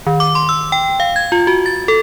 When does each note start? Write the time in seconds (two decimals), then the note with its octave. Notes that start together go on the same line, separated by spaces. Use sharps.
0.07 D#3
0.20 D6
0.35 C6
0.49 E6
0.72 G5
1.00 F5
1.16 G#6
1.32 F4
1.47 F#4
1.66 A6
1.88 A4